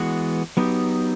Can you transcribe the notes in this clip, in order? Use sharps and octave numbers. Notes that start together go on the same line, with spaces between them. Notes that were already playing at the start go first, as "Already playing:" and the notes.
Already playing: E3 G#3 B3 F#4
F#3 B3 D#4 G4